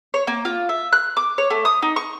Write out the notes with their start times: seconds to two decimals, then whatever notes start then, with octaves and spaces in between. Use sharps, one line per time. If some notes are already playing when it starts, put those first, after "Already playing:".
0.14 C#5
0.27 A#3
0.45 F4
0.69 E5
0.93 F#6
1.17 D6
1.38 C#5
1.50 A3
1.65 D#6
1.82 D#4
1.96 C#6